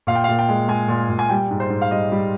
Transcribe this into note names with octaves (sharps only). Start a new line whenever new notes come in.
A#2 F5
G5
A#2 F5
G5
G#3
G#3 G#5
A#2
A#2
G#5
G3 G5
G#2
C5
G#2
F5
G3 D#5
G3